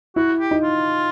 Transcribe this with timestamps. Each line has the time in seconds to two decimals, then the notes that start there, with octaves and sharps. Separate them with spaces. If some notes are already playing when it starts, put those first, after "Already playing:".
0.16 E4 F#4
0.40 G4
0.51 D#4
0.63 F4